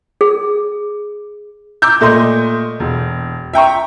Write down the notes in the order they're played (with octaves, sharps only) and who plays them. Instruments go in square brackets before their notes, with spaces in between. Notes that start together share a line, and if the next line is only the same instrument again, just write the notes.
[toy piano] G#4
[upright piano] A#5 D6 E6 G6
A#2 A3 D#5 C6
E1
E5 G5 A#5 C#6